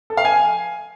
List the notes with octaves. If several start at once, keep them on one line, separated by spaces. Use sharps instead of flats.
A4
F5
G#5